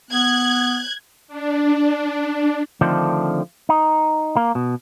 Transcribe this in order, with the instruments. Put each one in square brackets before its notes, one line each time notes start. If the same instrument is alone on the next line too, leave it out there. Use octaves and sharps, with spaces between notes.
[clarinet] B3 [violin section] F#6 G#6
[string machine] D4
[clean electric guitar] D3 D#3 F3 A3 C4 D4
D#4
A#3
B2